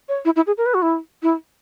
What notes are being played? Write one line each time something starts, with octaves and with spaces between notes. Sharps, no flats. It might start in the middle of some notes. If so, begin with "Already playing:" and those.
C#5
E4
E4
G#4
A#4
B4
F#4
E4
E4